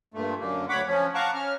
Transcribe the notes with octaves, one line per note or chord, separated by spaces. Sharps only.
G2 A#2 A3
F#2 D3 A#3
D2 C#5 F#5 B5 D6
F3 C#4
F5 F#5 A5 A#5 C#6 D6
C#4 F6